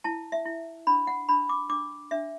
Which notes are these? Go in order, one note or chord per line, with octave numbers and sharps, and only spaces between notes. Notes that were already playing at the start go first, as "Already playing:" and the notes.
E4 A5
E5
E4
D4 B5
F#5
D4 B5
D6
D4 D6
D4 E5